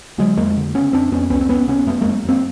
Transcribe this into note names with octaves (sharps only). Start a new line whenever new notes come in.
D3 F#3 G#3
F2 G#3 A#3
D3
C#3 B3 C#4
F2 C4 D4
F2 B3 C#4
C#2 B3 C#4
C4
C#2 B3 C#4
C3 B3 C#4
F#2 A3 B3
F#2 G#3 A#3
F#2 A#3 C4